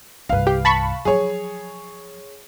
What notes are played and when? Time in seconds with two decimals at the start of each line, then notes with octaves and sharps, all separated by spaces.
0.29 C2 G2 B4 F5
0.47 G4
0.65 A5 B5 C#6
1.05 F3 F#3 G#4 C#5